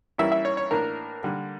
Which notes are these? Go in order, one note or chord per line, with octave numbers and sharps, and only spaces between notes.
E3 G3 A#3 C#4 E4 E5
E5
C#5
C#5
A2 E3 A#3 D4 A#4
D3 G3 A#3